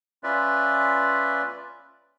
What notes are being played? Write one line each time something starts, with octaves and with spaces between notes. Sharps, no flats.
C#4 F4 B4 D5 E5